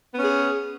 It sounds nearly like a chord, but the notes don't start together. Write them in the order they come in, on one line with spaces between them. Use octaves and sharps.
B3 C#4 G#4